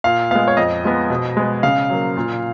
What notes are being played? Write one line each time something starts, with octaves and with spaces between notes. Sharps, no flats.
A#2 F5
G#3 B3 F5
C#5
F2 D#5
F3 G#3 B3
B2
G#3 B3
C#3 F5
F#3 A#3
A#2